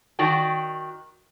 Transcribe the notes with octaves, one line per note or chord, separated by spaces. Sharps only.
D#3 F#4 D5 G5